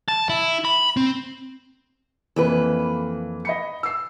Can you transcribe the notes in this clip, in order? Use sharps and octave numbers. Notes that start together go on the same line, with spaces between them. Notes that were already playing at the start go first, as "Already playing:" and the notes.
A5
E4
B5
C4
F2 E3 A#3 B4
D#5 B5 C#7
E6 C7